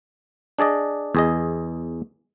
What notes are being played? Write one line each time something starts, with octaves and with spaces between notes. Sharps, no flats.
D4 G#4 D5 D#5
E2 G#4 D#5